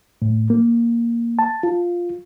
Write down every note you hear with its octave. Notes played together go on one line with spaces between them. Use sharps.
A2
A#3
A5
F4